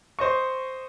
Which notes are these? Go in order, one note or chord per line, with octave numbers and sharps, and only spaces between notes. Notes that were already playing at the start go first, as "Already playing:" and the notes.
C5 D#5 C#6